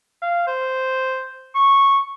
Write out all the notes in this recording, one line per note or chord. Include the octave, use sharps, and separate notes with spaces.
F5
C5
C#6